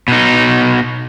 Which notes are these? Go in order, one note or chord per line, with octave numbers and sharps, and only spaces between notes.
B2 D#4